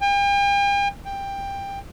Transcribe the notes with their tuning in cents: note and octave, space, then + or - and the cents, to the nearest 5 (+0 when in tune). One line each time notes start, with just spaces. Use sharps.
G5 +45
G5 +15